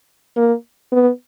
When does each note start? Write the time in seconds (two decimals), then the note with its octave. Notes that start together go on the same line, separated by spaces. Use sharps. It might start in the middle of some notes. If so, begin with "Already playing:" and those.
0.36 A#3
0.92 B3